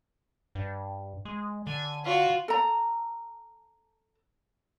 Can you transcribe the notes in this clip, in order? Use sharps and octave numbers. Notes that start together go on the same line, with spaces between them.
G2
G#3
D3 G#5
F4 F#4
A4 A#5